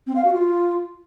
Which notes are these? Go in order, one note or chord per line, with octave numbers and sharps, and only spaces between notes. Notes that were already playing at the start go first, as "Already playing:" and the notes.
C4
F5
F#4
F4